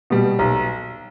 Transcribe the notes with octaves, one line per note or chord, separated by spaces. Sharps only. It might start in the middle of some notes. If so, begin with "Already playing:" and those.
B2 G3
B1